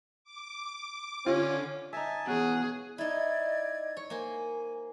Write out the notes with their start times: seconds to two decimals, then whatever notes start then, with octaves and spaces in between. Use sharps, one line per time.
0.24 D6
1.26 D3 C#4 F4
1.93 D#4 E5 G#5 A5
2.27 B2 E3 C#4 G#4 F#5
2.98 D#4 E4 D5 D#5 G#6
3.97 C#5
4.10 A#3 C5 G#5